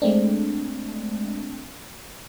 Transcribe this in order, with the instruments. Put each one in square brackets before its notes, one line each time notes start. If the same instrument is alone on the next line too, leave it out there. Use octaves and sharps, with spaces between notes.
[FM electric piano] G#3 A3 C4 D4